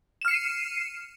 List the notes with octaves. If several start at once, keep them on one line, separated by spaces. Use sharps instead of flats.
F6 C7 C#7 D#7 E7